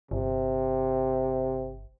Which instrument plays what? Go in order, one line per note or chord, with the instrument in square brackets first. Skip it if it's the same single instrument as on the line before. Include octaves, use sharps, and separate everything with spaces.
[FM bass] G1 [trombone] C3